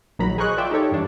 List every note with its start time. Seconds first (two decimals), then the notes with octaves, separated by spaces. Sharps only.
0.19 A#1 D#3 F#3 A#5 B5
0.38 G#4 A#4 C5 D#5 C#6 F#6
0.58 F4 D5 E5 G5
0.71 D#4 G4 A4 C#5
0.92 G2 E3 D4